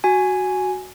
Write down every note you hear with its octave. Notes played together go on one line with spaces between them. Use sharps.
F#4 G#5